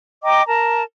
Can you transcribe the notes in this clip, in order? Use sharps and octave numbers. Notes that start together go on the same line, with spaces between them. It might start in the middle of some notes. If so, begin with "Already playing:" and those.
D#5 G5 A#5 D6
A#4 A5 A#5